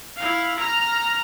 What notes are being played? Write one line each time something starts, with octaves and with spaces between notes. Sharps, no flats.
E4 F5
A#5 F6